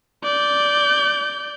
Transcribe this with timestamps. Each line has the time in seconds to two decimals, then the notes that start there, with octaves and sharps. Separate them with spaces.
0.24 D5 G6